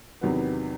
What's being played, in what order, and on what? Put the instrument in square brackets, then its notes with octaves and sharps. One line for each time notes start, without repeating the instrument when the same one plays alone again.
[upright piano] E2 C3 D#3 F#3 B3